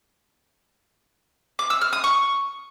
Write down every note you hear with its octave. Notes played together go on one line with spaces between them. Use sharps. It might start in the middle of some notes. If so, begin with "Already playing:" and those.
D6
E6
F6
D#6
C#6